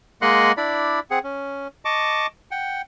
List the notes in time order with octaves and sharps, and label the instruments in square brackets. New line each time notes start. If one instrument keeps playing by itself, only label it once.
[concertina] G#3 A#3 D#5 F#5 C6 F#6
D4 E4 D5 B5
C4 G#4 F#5
C#4
D#5 A5 C#6 D6
F#5 G5